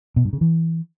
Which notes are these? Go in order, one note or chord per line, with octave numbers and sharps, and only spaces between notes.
B2
G2
C#3
E3